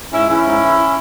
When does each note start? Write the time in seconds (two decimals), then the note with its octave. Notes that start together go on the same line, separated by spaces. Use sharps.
0.13 G#2 C#4 E4
0.29 E3 C#4 E4
0.46 G#2
0.62 E3